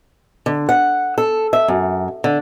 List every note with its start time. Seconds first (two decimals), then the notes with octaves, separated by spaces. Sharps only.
0.46 D3
0.69 F#5
1.18 A4
1.53 E5
1.68 F#2
2.24 D3